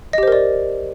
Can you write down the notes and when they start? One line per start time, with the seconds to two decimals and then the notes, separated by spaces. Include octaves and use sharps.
0.13 D#5
0.18 G4
0.23 C5
0.28 A#4
0.32 D5